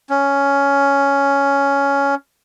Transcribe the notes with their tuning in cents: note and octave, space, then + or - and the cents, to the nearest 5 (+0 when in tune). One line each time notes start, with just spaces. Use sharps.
C#4 +10